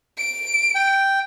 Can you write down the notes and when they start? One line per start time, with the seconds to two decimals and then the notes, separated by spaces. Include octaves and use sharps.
0.17 D7
0.75 G5